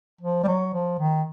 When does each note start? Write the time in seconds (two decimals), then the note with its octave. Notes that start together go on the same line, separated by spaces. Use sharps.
0.21 F3
0.44 G3
0.48 F#3
0.73 F3
0.99 D#3